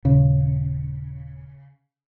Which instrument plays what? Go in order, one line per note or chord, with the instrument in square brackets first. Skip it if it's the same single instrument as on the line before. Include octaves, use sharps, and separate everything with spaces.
[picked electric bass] D#1 [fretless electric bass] C#3